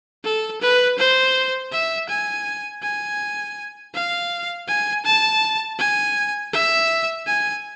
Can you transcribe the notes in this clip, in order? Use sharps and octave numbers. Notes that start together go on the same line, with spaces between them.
A4
B4
C5
E5
G#5
G#5
F5
G#5
A5
G#5
E5
G#5